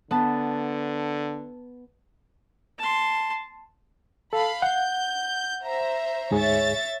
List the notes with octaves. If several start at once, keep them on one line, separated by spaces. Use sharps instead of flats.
D3 B3 A5
A5 C6
A4 F5 B5
F#5 G6
C5 E5 A#5
D2 G#2 G#4 C#5 E5 A6